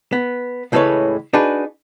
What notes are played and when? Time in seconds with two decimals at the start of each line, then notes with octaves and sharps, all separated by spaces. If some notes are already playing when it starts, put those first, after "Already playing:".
0.13 B3
0.72 C#2 A2 E3 G#3 B4 C#5
1.33 D4 D#4 F#4 G#4 B4